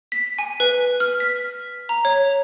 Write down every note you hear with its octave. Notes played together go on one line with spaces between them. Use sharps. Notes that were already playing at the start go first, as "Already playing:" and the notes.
B6
G#5
B4
F6
B6
A#5
C#5